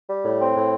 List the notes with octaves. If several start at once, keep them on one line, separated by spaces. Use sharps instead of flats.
G3
A2
C4
A2